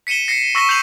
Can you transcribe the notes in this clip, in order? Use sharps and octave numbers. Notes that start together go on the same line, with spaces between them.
B6 C#7 D#7 E7 G7
A#6 C7 C#7
C#6 E6 A#6 B6 E7 G7
E6 G6 C7 D#7 F7 F#7